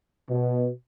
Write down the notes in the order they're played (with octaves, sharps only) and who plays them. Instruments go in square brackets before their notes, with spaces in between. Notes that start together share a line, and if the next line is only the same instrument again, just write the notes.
[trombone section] B2